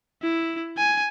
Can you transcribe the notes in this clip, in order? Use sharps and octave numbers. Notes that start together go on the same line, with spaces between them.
E4
G#5